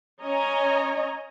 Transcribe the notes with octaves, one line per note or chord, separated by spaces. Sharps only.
C#4 C#5 D#5 G#5 A#5